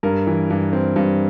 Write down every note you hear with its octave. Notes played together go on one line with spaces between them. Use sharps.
G2 A#4
E3
G2
C4
G2